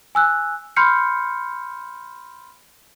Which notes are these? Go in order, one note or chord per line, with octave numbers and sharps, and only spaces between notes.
G#5 E6 F#6
B5 C6 F6 G6 C7 C#7